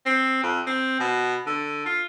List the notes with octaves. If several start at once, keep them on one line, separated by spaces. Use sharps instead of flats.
C4
F2
C4
B2
D3
F4